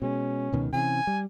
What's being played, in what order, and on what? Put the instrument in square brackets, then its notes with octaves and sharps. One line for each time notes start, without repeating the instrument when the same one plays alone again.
[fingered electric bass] B2 G#3 [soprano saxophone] C#4
[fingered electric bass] C#2 B2 D#3
[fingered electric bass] C3 E3 C#4 [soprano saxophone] G#5
[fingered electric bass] G3